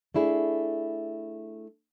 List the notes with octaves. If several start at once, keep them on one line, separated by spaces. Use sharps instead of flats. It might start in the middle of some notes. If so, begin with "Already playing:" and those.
A3 D4 E4 G#4